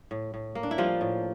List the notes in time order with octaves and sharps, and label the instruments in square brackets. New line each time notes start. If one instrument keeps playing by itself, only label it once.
[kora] A2
A2
A#3
D4
E4
F3 G3 F4
A2